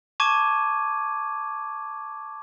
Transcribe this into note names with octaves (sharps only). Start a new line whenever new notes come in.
A5 C#6 D6 G#6 D#7